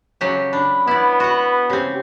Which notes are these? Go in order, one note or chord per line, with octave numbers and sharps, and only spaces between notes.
C#3 F#3 G4
D4 B5
B3 E4 D5
F#4 F#5
C#3 C4 G4